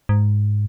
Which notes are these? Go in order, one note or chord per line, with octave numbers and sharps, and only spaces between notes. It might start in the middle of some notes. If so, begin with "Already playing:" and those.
G#2